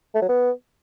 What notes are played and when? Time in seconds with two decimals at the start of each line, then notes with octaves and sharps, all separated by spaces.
0.15 A3
0.22 F#3
0.29 B3